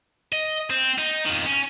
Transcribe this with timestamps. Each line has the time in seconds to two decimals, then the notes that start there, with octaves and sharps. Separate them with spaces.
0.33 D#5
0.70 C4
0.99 D#4
1.26 F2 D#3
1.46 C#4